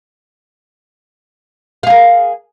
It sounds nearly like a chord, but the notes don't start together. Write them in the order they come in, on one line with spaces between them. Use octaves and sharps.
F5 G#4 A#4